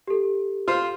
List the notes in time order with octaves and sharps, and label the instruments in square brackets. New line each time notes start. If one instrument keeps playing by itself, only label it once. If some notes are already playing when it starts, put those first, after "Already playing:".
[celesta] G4 A4
[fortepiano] F4 C5